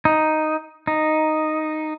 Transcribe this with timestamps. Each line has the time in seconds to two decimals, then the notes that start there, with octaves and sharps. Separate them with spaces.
0.05 D#4
0.87 D#4